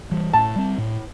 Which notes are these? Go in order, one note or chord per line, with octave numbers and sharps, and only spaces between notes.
E3 G3
A2 A5
G3 C4
A2